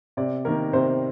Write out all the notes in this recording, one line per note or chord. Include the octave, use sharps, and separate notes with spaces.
C3 D5
D#3 A#3 A#4
C3 C5